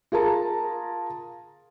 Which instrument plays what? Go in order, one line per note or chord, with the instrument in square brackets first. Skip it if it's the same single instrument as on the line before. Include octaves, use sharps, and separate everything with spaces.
[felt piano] F4 G#4 A#4 A5 A#5